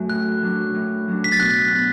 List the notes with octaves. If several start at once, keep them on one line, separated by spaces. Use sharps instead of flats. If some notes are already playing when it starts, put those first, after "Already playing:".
Already playing: F#2 F#3 A3 F#4
A2 F#6
F#3 D4
A2
F#3 D4
B6
A6
B2 F#6
B3 F#4